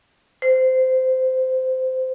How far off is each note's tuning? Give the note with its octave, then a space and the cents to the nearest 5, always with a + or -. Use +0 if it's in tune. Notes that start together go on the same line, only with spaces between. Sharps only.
C5 -15